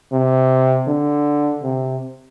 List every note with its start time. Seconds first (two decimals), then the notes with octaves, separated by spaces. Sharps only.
0.12 C3
0.87 D3
1.63 C3